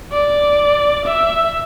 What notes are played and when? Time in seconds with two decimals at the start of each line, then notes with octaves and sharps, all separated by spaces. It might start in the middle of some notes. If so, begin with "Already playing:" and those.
0.12 D5
1.06 E5